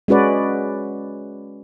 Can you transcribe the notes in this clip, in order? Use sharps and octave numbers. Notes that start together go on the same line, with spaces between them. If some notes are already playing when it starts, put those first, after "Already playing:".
G#3 C#4 F#4 B4 D5